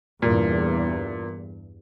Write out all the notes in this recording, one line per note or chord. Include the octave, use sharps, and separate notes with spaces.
E2 G2 A#2